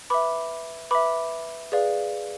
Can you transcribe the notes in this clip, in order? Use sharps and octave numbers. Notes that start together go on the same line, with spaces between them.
B4 E5 B5 D6
B4 E5 B5 D6
G#4 B4 D5 F5